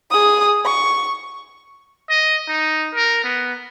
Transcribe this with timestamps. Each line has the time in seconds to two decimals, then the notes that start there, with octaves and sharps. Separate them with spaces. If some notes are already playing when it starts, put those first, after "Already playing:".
0.11 G#4 D#6
0.65 C#6
2.10 D#5
2.49 D#4
2.94 A#4
3.24 B3